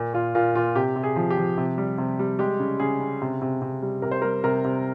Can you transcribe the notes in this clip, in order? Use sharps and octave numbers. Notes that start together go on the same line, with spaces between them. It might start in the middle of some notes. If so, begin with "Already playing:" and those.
Already playing: A#2
A#2 F4
A#2 F4
A#2 F4
C3 G4
C3
G#4
F3
G4
F3
C3
G3
C3
G3
G#3 G4
C#3
C#3 G#4
C#3
C3
C3
C3
G3
C3 A#4
C5
G3 A#4
C3 A#4
C3